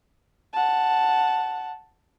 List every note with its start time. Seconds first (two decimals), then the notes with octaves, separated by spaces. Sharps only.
0.53 F#5 A5